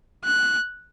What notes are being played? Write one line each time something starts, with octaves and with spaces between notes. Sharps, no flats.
F#6